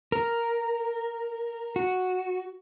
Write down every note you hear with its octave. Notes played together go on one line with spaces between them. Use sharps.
A#4
F#4